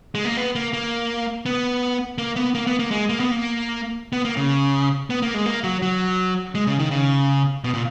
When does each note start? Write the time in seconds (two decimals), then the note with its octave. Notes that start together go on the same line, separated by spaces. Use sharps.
0.15 G#3
0.25 A#3
0.37 B3
0.55 A#3
0.73 A#3
1.46 B3
2.18 A#3
2.36 B3
2.55 A#3
2.67 B3
2.79 A#3
2.91 G#3
3.09 A#3
3.20 B3
3.31 A#3
4.13 B3
4.25 A#3
4.37 C#3
5.10 B3
5.22 A#3
5.34 G#3
5.46 A#3
5.64 F#3
5.82 F#3
6.55 G#3
6.67 C#3
6.79 D#3
6.91 C#3
7.64 B2
7.74 A#2